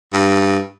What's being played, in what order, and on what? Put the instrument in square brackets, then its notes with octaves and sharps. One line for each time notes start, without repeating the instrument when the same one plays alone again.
[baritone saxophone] G2